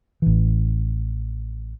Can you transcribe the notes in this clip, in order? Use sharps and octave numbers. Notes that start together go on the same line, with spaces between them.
A1 E3